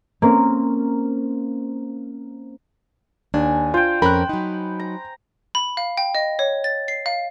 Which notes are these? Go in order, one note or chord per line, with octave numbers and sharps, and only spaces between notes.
A#3 C4 C#4
D#2 D4 G#5
F4 C5 G5
F2 C#4 A#4 B5 F#6
F#3 D#4
A#5
B5
F5
G5
D#5
C#5
A6
C7
F5